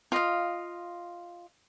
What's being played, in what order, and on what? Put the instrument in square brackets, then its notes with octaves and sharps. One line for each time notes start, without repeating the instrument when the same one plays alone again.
[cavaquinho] F4 D#5 F5